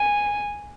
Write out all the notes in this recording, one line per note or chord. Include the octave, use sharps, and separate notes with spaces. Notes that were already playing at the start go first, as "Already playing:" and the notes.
Already playing: G#5